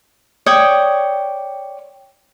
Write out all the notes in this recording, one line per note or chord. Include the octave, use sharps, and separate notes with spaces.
C#5 D5 G5 D#6